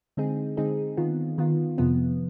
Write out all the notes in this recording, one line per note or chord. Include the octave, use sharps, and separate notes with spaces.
D3 G#3 C4 D#4 G#4
D3 G#3 C4 D#4 G#4
D#3 B3 F4
D#3 B3 F4
F2 C3 F3 B3